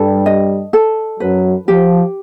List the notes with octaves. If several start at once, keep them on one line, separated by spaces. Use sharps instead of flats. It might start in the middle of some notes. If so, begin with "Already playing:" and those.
Already playing: G2 G3 A4
D#5
A4
F#2 F#3 B4
F3 G4